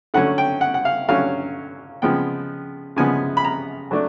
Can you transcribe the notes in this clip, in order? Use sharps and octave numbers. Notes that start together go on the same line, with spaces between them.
D3 F#3 A3 C#4 F#5
G5
F#5
F#5
F5
D3 F#3 A3 C#4 F5
C#3 F3 G#3 B3 G5
C#3 F3 G#3 B3 G#5
B5
A#5
F#3 A3 D4